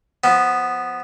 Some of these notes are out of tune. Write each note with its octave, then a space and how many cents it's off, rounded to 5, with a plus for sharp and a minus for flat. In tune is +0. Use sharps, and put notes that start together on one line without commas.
F3 +0 B3 +0